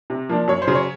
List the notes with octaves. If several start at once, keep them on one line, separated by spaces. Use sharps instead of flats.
C3
F3 A#3 D4
F#2 C#5
C5
C#3 F#3
C#5